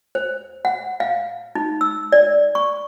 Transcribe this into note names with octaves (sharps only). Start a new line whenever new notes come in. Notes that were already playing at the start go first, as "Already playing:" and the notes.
C5
F#5
F5
D#4
E6
D5
C#6